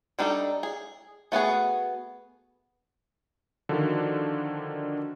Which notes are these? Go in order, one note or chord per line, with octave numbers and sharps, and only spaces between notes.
G3 D4 D#4 G#4 A4
G#4
A3 B3 F#4 G#4
D3 D#3 F3 D4 F4 F#4